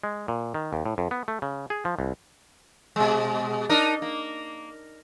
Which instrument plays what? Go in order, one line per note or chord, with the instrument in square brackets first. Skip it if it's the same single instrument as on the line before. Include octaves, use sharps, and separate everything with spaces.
[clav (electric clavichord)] G#3
A#2
D#3
D#2
A2
F2
B3
A3
C#3
G#4
F3
C2
[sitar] B2 G#3
D4 D#4 A#4
A#3